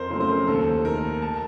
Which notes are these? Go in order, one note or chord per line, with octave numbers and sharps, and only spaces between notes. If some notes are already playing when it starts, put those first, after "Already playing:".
Already playing: F2 A#4 C5
C#3 F#3 A3 C5
C5
A#4
D#2 A4
D#3 A3 A#4
A5